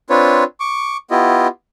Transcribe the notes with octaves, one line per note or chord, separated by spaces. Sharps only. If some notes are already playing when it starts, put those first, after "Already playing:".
C4 D4 F4 B4 C#5
C#6 D6
B3 E4 F4 G4 D#5